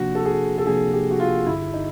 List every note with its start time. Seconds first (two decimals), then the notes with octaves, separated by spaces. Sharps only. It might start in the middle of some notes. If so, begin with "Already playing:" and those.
Already playing: C3 F3 A#3 D4 F#4
0.15 A4
0.25 G#4
0.58 A4
0.65 C3 F3 A#3 D4 G#4
0.93 G4
1.11 F#4
1.20 F4
1.47 G1 G2 D3 E4
1.74 D#4